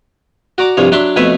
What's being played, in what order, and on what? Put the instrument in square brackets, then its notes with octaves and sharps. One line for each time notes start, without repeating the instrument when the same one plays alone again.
[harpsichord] F#4 D5 A#5 D6
C2 G2 F3 C#5
F#3 D4 D5 E5 A5 C6
F2 B2 A3 B4 C#5 E5